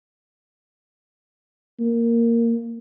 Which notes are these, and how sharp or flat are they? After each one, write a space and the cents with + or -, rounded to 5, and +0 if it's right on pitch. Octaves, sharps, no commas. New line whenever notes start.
A#3 -5